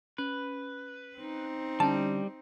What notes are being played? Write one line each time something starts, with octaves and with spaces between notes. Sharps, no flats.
C#4 B4
C4 D#4
D3 G3 C#4 D4 A5